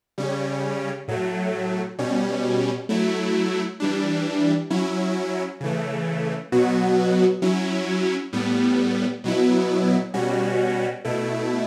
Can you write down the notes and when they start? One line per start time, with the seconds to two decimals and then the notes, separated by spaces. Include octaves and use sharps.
0.18 C#3 G3 C#4
1.08 A2 F#3 A3
1.99 B2 G3 C#4
2.89 F#3 A3 E4
3.80 E3 G3 D4
4.70 F#3 C#4 E4
5.61 C#3 E3 A3
6.52 B2 F#3 B3 F#4
7.42 F#3 C#4 E4
8.33 A2 G3 B3
9.24 B2 F#3 B3 E4
10.14 B2 G3 C#4 F#4
11.05 B2 A3 E4